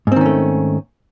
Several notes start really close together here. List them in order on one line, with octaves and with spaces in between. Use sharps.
G#2 C4 D#3 C#4 A3